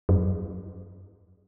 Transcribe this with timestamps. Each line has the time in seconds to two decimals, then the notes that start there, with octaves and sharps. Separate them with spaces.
0.09 F#2